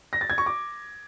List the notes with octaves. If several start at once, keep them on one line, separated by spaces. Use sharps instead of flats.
A#6
A6
G#6
C#6
D6